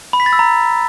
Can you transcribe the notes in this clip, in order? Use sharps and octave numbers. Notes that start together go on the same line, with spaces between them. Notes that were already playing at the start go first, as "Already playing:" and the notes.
B5
B6
A6
E6
A#5